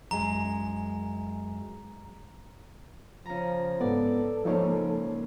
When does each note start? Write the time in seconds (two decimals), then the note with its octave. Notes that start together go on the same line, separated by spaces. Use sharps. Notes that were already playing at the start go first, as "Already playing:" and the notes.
0.11 F#2 G#3 A#5
3.26 C#3 F3 A#5
3.81 G#2 B3 A4 D5
4.45 G#2 C#3 F3 A#3 D#4 C#5